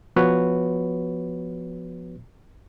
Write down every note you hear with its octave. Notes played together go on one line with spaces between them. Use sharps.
F3 B3 F#4 B4 C#5